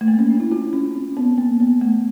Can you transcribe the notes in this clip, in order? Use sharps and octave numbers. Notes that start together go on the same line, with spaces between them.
A3
A#3
C#4
D4
E4
F4
C#4
C4
B3
A#3
B3
A3